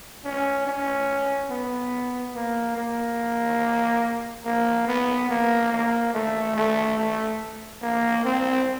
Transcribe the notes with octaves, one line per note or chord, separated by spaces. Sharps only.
C#4
C#4
B3
A#3
A#3
A#3
B3
A#3
A#3
A3
A3
A3
A#3
C4